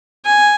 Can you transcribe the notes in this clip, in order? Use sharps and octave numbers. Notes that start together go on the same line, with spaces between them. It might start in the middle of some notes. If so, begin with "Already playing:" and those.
G#5